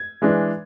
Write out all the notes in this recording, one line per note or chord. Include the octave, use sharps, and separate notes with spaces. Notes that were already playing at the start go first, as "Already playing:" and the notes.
Already playing: G#6
E3 G#3 D4